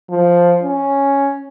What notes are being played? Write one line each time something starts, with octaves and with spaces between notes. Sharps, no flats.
F3
C#4